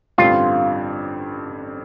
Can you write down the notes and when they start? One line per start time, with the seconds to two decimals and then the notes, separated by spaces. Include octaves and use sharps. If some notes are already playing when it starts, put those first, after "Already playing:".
0.18 A1 G2 D3 G3 C4 F4